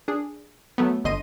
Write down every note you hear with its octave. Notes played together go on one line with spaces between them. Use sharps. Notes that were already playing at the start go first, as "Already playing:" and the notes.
D4 G#4
F#3 A3 B3
G1 D3 D#5 C6 D#7